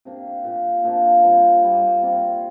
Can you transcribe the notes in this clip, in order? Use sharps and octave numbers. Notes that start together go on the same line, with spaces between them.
C3 A#3 D4 G4
A#2 A#3 G4
A#2 F3 A#3 D4
A#2 G3 C4
A#2 G3 A#3
C3 A#3 F4